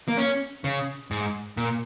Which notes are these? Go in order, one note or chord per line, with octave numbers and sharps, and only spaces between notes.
A#3
C#4
C#3
G#2
A#2